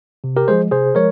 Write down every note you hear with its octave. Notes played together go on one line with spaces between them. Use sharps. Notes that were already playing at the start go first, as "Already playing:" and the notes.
C3
G4 A#4
F3 G#3 G#4 C5
C3 G#4 C5
F3 G#3 A#4 C#5